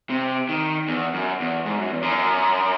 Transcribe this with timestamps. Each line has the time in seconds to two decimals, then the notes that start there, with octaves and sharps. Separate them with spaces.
0.10 C3
0.49 D#3
0.88 E2
1.14 F#2
1.40 E2
1.66 G#2
1.78 F#2
1.91 E2
2.02 F#2